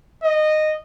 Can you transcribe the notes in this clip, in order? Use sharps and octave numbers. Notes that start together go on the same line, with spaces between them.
D#5